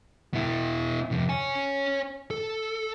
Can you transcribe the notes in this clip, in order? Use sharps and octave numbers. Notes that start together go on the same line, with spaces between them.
B2 E4
F2 C3
C#5 G#5
A4